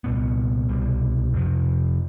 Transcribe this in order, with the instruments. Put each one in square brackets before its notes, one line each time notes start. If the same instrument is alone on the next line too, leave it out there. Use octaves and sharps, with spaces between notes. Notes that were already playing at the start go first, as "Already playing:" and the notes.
[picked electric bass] C2 A#2 G3 B3
C2 B2 G3
F2 C3 F3